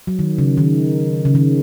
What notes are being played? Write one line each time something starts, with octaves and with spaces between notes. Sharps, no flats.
F#3
D#3
C#3
D#3
C#3
D#3